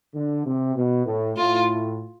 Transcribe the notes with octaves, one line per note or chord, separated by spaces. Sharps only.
D3
C3
B2
A2
A2 F4